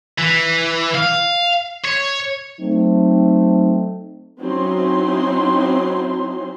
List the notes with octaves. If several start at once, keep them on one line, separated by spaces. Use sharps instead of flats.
E3
F5
C#5
F#3 A3 C4 D#4
F#3 C4 C#4 D#4 E4 C6